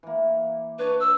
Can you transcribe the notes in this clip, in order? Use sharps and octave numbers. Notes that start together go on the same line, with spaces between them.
E3 A#3
D4 B4 C#5
E6